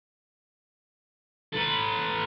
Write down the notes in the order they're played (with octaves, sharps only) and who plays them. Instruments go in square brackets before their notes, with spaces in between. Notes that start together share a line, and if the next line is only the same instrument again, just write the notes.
[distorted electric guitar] A4 B4